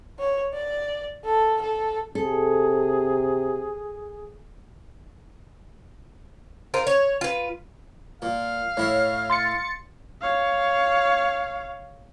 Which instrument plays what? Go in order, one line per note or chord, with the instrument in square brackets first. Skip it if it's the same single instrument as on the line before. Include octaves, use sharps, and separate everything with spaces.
[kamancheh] C#5
D5
A4
A4
[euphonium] C3 [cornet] G#4 [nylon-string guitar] A4
[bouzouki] F4 A#4 C5
C#5
F4 B4
[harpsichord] A#2 [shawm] F5
[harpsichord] A2 E4 E5 [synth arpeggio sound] C#5
[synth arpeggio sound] C6 A6 C#7
[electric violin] C#5 F5